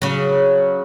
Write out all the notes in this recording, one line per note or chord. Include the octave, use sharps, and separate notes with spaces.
C#3 F#3